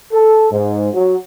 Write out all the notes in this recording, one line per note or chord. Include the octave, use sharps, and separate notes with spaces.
A4
G#2
F#3